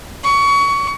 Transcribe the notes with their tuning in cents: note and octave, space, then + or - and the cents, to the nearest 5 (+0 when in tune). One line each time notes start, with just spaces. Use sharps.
C#6 +25